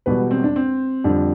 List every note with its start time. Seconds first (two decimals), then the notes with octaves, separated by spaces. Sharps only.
0.06 E1 E2 B2 G3 B4
0.31 C4
0.44 D4
0.56 C4
1.04 F2 D3 G3 D4